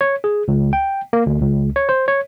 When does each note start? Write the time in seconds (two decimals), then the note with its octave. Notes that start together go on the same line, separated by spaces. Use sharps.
0.01 C#5
0.24 G#4
0.48 C#2
0.73 G5
1.13 A#3
1.26 D2
1.42 C#2
1.76 C#5
1.89 C5
2.08 C#5